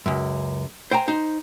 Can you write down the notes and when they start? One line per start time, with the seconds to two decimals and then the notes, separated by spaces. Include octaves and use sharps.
0.06 C#2 F#2
0.91 C5 G5 G#5 A#5
1.08 D#4 C5